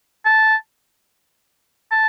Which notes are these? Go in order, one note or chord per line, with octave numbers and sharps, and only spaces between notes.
A5
A5